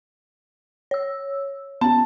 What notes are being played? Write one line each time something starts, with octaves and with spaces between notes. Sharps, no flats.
C#5 E6
B3 C#4 A5